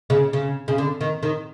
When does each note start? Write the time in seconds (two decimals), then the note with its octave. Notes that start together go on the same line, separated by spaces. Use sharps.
0.10 C#3
0.33 C#3
0.68 C#3
0.78 D3
1.01 D#3
1.23 D#3